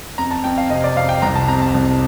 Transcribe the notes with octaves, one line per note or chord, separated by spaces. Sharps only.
F2 A#5
A5
F2 G5
F5
C3 D#5
D5
F2 F5
G5
C2 A#5
A5
C3 A#5
A5
C2